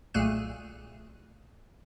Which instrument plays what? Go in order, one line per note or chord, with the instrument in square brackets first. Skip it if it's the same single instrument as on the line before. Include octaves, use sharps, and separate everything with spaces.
[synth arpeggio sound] B1 A#2 A3 G#4 F#6 D#7